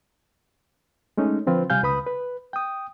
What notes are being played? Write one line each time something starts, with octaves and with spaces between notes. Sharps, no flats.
G#3 A3 C#4 D#4
D3 F3 C4 F4 B4
C3 G3 F5 G#5 G6
C#2 B4 B5 D#6
B4
G5 D#6